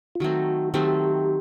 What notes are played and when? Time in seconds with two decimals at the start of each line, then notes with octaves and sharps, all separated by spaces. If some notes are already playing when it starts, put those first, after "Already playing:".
0.15 F4
0.20 D#3 F#3 A3 C4 F#4
0.74 D#3 F#3 A3 C4 G4